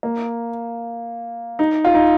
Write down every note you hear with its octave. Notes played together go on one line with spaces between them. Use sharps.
A#3
D#4
F4
D#4